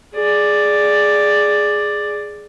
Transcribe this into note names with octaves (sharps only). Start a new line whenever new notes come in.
G#4 D5